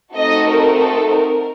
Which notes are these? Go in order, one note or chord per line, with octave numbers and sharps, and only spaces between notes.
A3 C4 D#4 F#4 A4 D#5
A#4
A4
A#4